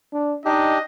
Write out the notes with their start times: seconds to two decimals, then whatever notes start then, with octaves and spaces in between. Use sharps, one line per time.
0.13 D4
0.45 D4 D#4 G4 D#5